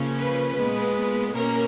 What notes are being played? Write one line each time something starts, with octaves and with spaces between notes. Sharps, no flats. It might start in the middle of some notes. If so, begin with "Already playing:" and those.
Already playing: C#3 F3 A#3 C#4
B4
A#2 G#3 B3
B2 A#3 C#4 A#4